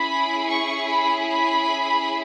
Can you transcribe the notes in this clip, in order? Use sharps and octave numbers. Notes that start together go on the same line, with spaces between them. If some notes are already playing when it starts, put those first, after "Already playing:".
Already playing: C#4 E4 G#4 B5
C#6
B5
B5